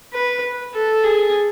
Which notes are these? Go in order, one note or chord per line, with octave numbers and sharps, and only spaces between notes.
B4
A4
G#4